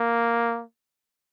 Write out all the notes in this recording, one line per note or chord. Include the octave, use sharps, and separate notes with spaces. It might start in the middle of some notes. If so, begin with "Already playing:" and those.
Already playing: A#3